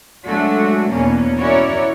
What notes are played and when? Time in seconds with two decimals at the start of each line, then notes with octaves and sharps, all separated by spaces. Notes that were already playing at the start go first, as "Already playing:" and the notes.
0.24 F#3 G#3 A3 D4 F#4
0.89 E2 B2 A#3 C#4 D4
1.37 C#4 E4 F#4 A#4 C#5 D5